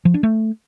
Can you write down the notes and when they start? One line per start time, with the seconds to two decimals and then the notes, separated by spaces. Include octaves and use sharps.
0.05 F3
0.14 D4
0.23 A3